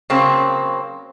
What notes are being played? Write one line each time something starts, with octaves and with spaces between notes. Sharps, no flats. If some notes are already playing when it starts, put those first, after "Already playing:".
C#3 F#3 A#3 C4